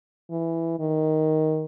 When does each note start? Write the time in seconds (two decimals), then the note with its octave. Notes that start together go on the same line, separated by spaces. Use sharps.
0.30 E3
0.79 D#3